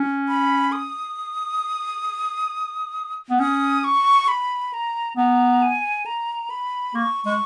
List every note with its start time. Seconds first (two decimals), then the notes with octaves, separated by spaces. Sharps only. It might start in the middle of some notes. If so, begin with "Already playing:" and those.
Already playing: C#4
0.28 B5
0.72 D#6
3.30 B3
3.40 C#4 D#6
3.84 C#6
4.28 B5
4.74 A#5
5.17 B3 A#5
5.62 G#5
6.06 A#5
6.50 B5
6.95 A#3 C#6
7.25 G#3 C#6